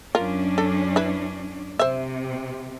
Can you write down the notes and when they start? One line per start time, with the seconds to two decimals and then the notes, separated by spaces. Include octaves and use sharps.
0.15 F#2 C#4 D4 F4 A#4
0.58 A4
0.96 E4 B4
1.79 C3 C5 E5